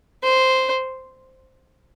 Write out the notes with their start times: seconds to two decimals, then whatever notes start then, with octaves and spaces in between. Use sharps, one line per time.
0.23 C5